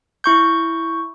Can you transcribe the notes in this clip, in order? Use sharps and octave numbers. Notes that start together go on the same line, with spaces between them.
E4 C#6 G6